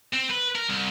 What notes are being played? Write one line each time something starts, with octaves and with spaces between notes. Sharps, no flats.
C4
B4
A#4
C2